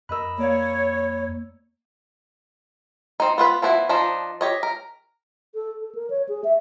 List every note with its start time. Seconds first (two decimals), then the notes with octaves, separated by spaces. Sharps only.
0.09 F2 A#4 D#5 B5 E6 F#6
0.38 A#3 C#5 D5 F5
3.20 C4 D#4
3.38 B3 F4 B4
3.62 F3 B3 E4 F#4
3.89 F3 D4 D#4
4.41 G4 C#5 D#5
4.63 A#4
5.55 A4
5.81 A4
5.95 A#4
6.10 C#5
6.29 G#4
6.44 E5